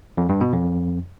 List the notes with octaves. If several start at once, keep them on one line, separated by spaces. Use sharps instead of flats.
F2
G2
B2
F2